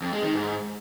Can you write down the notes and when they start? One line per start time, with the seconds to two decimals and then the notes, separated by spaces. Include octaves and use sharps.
0.02 F2
0.12 G#3
0.23 D#3
0.34 G#2